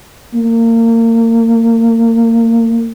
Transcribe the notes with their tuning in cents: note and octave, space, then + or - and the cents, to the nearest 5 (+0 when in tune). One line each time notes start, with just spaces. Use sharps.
A#3 -30